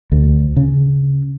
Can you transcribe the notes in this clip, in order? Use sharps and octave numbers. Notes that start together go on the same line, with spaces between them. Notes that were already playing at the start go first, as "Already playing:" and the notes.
D2
C#3